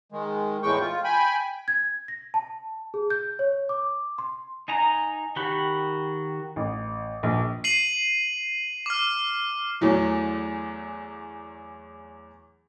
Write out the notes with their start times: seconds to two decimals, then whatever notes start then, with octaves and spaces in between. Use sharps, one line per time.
0.12 D#3 G#3
0.63 E2 A2 G#3 G5 C#6
0.80 F4
1.04 G5 G#5 B5
1.68 G#6
2.08 A#6
2.34 A5
2.94 G#4
3.10 G6
3.39 C#5
3.69 D6
4.18 C6
4.68 D#4 G#5 A#5
5.36 D#3 F#4 G4 B5
6.56 A1
7.23 A#1
7.64 C7 D#7 F#7
8.86 D6 F6
9.81 E2 E3 F#3 A3